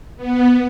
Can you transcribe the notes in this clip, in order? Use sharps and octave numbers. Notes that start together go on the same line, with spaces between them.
B3